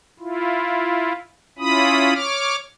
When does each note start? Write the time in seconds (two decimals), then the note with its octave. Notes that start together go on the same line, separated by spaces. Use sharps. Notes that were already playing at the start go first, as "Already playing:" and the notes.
0.19 E4 F4
1.59 C#4 E4 F4 B5 D#6
2.14 C#5 D6 F6